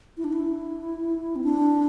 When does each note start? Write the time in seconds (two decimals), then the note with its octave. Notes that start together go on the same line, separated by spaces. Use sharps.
0.17 E4
0.24 D4
0.32 E4
1.36 C4
1.44 D4